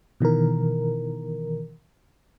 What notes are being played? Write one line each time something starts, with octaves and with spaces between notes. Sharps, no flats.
B2 D#3 E3 A#4